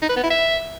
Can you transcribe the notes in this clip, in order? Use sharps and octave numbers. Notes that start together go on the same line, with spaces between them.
D#4
B4
B3
E4
E5